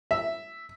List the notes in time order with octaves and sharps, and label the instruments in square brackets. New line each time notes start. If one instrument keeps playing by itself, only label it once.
[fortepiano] E5